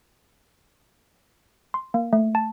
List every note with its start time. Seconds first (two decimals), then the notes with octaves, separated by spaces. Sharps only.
1.74 C6
1.94 A#3
2.13 A3
2.35 A5